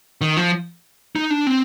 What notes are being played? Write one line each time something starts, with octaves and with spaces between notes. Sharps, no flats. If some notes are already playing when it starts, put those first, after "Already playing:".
D#3
F3
D#4
D4
C4